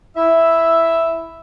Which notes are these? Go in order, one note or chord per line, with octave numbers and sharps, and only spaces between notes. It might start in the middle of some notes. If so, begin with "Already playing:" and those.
E4 E5